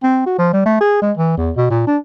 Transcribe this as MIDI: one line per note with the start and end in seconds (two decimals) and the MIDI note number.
0.03 0.22 60
0.26 0.37 66
0.38 0.52 53
0.53 0.64 55
0.66 0.75 57
0.80 0.98 68
1.02 1.12 56
1.17 1.35 52
1.37 1.51 40
1.56 1.66 47
1.70 1.87 46
1.87 1.97 62